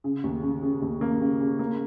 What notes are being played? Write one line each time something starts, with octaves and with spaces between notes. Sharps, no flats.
C#3
D#2
C#3
C#3
D#2
A#3
C#3
C#3
A#3